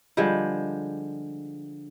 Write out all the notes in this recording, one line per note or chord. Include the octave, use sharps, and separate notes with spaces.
D3 F3 G3 G#3